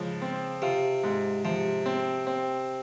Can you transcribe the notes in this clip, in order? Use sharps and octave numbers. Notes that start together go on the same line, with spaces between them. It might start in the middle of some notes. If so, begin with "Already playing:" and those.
Already playing: G#2 C#3 F3
C4
C3 F4
G#2
C3 F3
C4
C4